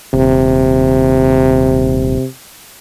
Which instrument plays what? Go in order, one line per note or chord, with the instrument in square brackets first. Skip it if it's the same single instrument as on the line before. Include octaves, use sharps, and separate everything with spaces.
[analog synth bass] D#1 [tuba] C3